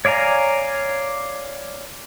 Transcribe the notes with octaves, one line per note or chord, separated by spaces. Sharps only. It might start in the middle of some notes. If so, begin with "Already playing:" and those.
C#5 D5 F5 G#5 A#5